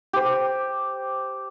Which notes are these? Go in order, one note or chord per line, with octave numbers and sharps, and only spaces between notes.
G4 C5